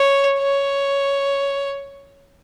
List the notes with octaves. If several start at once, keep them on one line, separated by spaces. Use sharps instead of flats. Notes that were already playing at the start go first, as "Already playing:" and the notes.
Already playing: C#5
C#5